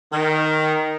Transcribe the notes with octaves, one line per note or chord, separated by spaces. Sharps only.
D#3